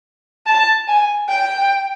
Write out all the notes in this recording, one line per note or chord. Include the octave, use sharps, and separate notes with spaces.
A5
G#5
G5